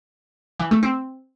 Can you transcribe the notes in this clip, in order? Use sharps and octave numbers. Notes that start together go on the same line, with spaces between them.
E3
A3
C4